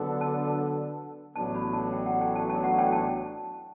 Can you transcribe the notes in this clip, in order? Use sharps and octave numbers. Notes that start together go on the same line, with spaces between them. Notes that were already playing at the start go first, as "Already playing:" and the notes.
Already playing: D3 F#3 B3 D4 A4
A5
A1 A2 F#3 B3 D4 A5
B5
A5
G5
F#5
G5
A5
A5
F#5
G5
A5